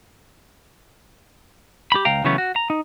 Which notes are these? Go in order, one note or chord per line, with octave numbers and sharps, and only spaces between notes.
G4 B5
C#2 F5 G5 A#5
C#3 E3 F#3 A3 B3 C#4
F#4
A#5
D#4